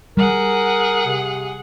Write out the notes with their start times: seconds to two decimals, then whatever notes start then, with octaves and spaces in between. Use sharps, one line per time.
0.17 G3 G#4 A#4 F#5
1.06 C3